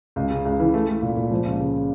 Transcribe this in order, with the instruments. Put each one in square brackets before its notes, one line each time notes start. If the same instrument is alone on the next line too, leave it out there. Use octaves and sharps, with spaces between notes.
[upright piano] C#2
C#3
C#2
E3
A3
A3
A#2
A#2
F3
C#2
C#3